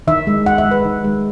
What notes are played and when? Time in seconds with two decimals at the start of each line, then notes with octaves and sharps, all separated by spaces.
0.07 D#3 E5
0.27 G#3
0.46 D#3 F#5
0.58 E5
0.65 G#3
0.71 B4
0.85 D#3
1.04 G#3